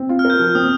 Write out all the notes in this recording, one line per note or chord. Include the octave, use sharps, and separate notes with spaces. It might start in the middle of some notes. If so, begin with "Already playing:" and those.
Already playing: C4
F4
F6
A#4
G6
F3 F6
C4 D#6